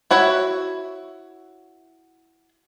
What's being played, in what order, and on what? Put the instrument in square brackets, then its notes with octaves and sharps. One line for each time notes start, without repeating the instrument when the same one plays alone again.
[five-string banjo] E4 F#4 C#5 E5